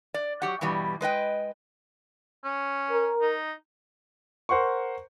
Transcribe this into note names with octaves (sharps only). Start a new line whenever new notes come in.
D5
F#3 G4 F#5
G2 B2 E3 G3
G#3 B4 D#5 G5
C#4
A#4
D#4
A#4 C5 F#5 C6 C#6